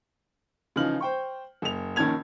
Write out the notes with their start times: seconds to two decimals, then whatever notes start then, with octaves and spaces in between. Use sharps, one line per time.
0.76 C#3 E3 F3 D#4 F6 F#7
1.01 C5 G5 C#6
1.62 F#1 F7
1.96 A#1 D#3 C#4 A5 G#6 F7